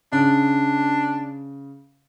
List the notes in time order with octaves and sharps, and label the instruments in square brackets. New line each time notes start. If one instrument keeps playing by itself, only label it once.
[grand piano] C#3 [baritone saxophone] D4